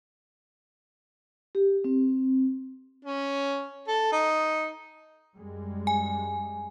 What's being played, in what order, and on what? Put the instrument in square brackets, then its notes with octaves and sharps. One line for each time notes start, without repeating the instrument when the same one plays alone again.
[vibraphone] G4
C4
[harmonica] C#4
A4
D#4
[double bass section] F#2 G3 G#3
[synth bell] G#5